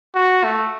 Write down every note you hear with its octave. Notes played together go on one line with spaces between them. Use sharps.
F#4
A3